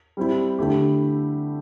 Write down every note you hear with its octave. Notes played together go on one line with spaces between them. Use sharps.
G3 C4 E4
D3 A3 E4 G4